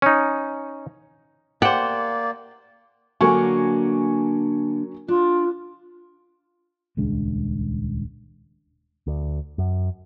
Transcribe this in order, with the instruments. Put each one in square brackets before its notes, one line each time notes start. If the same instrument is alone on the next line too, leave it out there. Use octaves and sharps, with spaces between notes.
[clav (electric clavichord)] C#4 D#4
[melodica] A#3 D5 [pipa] G4 C5 [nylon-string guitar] F#5
[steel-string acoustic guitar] D3 A#3 D4 [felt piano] F#3 G#5 C#6
[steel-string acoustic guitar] D4 [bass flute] F4
[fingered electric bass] D#1 C#2 G#3 D4
[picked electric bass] D2
F#2